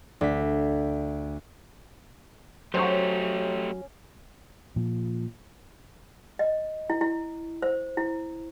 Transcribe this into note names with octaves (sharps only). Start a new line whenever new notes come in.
D2 B6
F#3 A3 C#4 G4 C5 C#6
A#2 F3
D#5
E4
E4
C5
E4